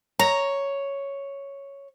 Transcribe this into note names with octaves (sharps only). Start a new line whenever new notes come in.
C#5 A#5